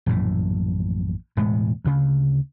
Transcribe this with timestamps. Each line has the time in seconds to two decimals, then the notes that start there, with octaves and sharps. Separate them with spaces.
0.06 A#1 F#2 A2 E3
1.37 E1 A2 G#3 A3
1.85 D2 C#3